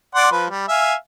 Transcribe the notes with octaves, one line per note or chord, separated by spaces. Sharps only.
D5 F#5 C6
F3 B4
G3
E5 F5 G#5